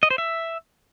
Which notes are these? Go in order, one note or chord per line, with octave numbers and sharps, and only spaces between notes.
D#5
C5
E5